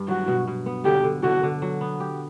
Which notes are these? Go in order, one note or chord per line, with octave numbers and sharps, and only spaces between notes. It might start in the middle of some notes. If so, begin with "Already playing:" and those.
Already playing: G2
F#3 F#4
B2
B2
B3
D3 G4
D3
D3 F#4
D3
F#3
B3
G4